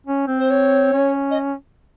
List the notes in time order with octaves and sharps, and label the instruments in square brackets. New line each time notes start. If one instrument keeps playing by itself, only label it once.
[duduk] C#4
C4
[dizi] C5
C#5
[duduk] C#4
[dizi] D#5